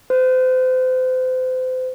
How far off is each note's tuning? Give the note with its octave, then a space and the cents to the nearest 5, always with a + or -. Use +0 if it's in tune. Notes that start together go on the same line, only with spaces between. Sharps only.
C5 -35